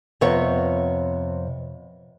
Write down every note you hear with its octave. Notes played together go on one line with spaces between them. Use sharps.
F2 C3 B3 C#5